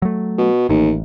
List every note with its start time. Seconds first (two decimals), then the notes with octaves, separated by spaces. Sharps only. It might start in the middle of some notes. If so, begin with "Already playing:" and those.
0.02 F#3 A3
0.38 B2
0.69 A1 D#2